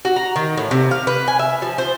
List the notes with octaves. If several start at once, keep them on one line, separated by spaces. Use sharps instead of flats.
F#4
A#5
D#3
A2
C3
F5
B4
G#5
E5
F3
C5